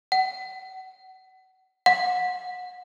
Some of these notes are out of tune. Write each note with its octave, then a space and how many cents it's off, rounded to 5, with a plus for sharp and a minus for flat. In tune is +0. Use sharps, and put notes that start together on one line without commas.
F#5 +30
F#5 -30